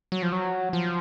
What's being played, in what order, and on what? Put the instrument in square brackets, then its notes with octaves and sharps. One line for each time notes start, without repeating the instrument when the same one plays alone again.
[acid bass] F#3
F3
F#3
F3